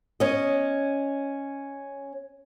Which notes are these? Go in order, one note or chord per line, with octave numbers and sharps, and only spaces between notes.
C#4 D#5